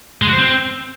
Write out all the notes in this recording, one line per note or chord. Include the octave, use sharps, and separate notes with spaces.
G#3
F#4
C5
C4